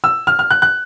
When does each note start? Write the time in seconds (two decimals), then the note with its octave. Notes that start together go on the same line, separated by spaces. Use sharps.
0.04 E6
0.27 F6
0.39 F6
0.51 F#6
0.62 F#6